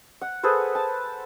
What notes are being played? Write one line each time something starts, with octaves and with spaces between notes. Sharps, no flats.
F#5
G#4 A4 B4 C5
A5